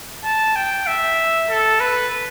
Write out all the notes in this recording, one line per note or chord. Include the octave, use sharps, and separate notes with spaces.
A5
G5
E5
A4
B4